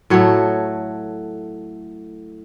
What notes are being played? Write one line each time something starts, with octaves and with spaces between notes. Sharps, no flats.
A2 F#3 A3 C#5